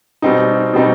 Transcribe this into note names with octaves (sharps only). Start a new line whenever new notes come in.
B2 G3 C4 D#4
B2 G3 C4 D#4